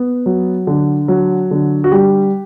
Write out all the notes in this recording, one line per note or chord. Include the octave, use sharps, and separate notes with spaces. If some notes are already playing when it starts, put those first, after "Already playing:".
Already playing: B3
F#3
D3
F#3
D3
F#4
G3 G4